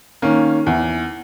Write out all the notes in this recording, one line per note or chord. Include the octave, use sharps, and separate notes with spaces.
D#3 A#3 C#4
E2